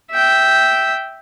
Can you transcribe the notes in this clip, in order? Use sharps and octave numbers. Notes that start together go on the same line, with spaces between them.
E5 G5